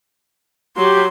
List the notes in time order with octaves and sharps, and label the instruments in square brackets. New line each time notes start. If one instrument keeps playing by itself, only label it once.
[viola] F#3 C6 [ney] G4